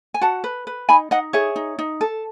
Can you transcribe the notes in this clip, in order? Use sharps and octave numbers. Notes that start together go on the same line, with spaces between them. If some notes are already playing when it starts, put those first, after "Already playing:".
G#5
F#4 F#5 A5
B4
B4
D#4 G#5 B5
D#4 D#5 F#5
G#4 C#5 E5
D#4
D#4
A4